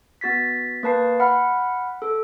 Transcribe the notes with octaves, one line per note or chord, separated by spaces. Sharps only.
B3 F#4 A6 B6
A#3 B4 A5 C7
F#5 B5 F6
A4